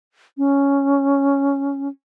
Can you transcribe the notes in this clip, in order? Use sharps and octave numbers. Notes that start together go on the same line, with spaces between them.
C#4